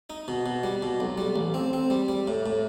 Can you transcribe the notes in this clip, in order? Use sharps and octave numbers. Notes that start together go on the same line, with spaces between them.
D#4
B2
B2
G3
B2
B1
G3
A1
C4
C4
G3
G3
A2
A2